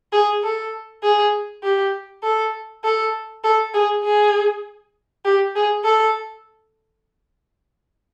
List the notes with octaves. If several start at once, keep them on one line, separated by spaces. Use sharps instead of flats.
G#4
A4
G#4
G4
A4
A4
A4
G#4
G#4
G4
G#4
A4